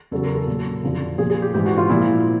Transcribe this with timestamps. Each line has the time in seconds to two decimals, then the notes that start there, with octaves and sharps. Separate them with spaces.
0.11 E2 C#3 F#3 A4
0.24 A#4
0.35 A4
0.47 A#2 F#3
0.83 F2 D3 F3
1.18 A#2 F3 G#4
1.30 G#4
1.42 G4
1.54 G#2 E3 G4
1.66 F#4
1.78 F4
1.89 A#2 F3 E4